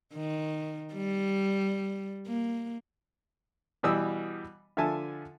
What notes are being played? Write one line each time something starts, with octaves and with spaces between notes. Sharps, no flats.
D#3
G3
A#3
B2 E3 G3 D#6 E6
D3 F3 E5 G#5 A5